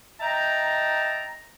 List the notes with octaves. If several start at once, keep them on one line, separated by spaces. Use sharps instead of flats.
D#5 E5 G5 A5 A#5